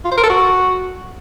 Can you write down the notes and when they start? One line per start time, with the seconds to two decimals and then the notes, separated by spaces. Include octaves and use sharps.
0.05 F4
0.11 C5
0.18 A#4
0.24 A4
0.30 F#4